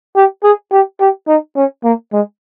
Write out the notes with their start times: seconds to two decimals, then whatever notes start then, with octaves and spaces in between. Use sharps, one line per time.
0.16 G4
0.44 G#4
0.72 G4
1.00 G4
1.28 D#4
1.56 C#4
1.84 A#3
2.12 G#3